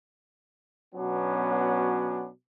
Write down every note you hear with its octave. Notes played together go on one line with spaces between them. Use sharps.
B2 F#3 B3 C#4 D4